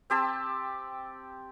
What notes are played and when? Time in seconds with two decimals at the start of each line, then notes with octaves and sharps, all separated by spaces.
0.10 C4 G4 A5 E6